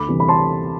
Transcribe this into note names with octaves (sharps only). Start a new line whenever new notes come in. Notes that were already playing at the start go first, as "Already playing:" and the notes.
Already playing: D2 B5 D6
C3 E3 G3
B5
A5 C6